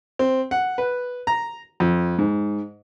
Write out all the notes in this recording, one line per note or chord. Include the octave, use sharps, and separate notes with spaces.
C4
F#5
B4
A#5
F2
G#2